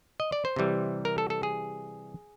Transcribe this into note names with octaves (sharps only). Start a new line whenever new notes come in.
D#5
D5
C5
C3 E3 G3
A#4
A4
A4
G#4